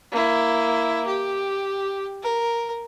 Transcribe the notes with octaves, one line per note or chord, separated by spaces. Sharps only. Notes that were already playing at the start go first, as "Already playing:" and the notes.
A#3 E4
G4
A#4